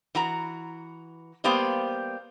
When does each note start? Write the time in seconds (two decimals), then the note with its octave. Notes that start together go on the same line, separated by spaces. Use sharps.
0.15 E3 F#4 A#5
1.44 G3 A#3 B3 G4 C5 F5